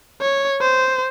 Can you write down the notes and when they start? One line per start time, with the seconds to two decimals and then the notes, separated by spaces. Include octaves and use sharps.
0.21 C#5
0.61 C5